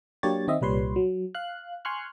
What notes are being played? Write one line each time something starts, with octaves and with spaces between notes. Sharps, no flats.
F#3 A#3 D4 G4 C#5 A6
D#3 C4 D#5 E5
C2 A#2 G3 B4 C#5 C6
F#3
F5 F#6
G#5 C6 C#6 F6 F#6